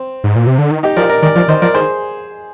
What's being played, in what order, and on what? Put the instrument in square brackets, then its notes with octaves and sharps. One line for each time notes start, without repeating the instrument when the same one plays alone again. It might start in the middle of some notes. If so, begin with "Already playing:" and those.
Already playing: [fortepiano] C4
[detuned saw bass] G#2
A#2
C3
D3
D#3
[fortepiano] D#4 G4
[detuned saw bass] F3 [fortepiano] A#4 D5
[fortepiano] A#4 D5
[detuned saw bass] D#3 [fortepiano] A#4 D5
[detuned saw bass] F3 [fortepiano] A#4 D5
[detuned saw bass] D#3 [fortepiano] C5 D#5
[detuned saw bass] F3 [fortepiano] A#4 D5
[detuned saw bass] D#3 [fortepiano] G#4 C5